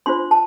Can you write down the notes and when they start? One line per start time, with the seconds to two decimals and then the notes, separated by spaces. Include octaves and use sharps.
0.06 D4 F4 C5 C6
0.31 A5